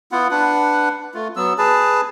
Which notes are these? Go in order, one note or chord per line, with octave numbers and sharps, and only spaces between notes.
B3 E4 F4 F#5
D4 B4 F#5
A3 F4
F#3 B3 E6
G#4 B4 A5